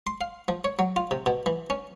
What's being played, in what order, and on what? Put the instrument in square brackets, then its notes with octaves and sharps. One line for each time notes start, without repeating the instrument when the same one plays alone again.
[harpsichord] C6
F5
F3
C#5
F#3
F4
C3
B2
E3
C#4